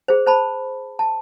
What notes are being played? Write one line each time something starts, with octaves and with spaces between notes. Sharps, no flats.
G#4 C5
C5 A5 B5
A5